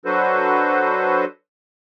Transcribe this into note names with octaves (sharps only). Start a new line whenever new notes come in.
F#3 D4 F#4 A4 B4 C5